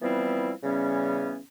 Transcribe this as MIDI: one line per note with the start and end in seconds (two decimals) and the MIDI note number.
0.02 0.51 52
0.02 0.51 53
0.02 0.51 55
0.02 0.51 59
0.02 0.51 60
0.02 0.51 64
0.63 1.38 49
0.63 1.38 52
0.63 1.38 55
0.63 1.38 59
0.63 1.38 61